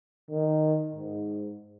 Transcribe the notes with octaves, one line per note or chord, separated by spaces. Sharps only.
D#3
G#2